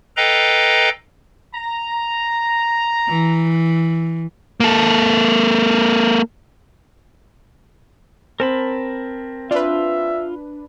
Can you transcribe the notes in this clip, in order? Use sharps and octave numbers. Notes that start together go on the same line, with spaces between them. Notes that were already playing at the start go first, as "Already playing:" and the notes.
A4 B4 D#5 F5 G5 A#5
A#5
E3
A#3 A4
C4 A#4 A5 B5
D4 F4 B4 E5